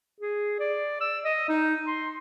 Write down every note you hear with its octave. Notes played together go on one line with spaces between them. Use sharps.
G#4
D5
E6
D#5
D#4
C6